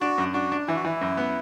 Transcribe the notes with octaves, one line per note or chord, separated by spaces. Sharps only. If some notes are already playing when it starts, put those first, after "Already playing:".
D4 F#4
F#2
D4 F#4
D4
E3 E4
F#4
E3 E4
F#2
B3